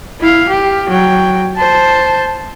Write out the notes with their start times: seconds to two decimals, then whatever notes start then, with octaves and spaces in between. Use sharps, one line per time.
0.20 E4 F5
0.48 G4
0.89 F#3 G5
1.57 C5 A5